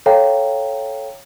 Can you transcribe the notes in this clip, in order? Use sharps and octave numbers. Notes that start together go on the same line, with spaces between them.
A4 C#5 F5 G5 A#5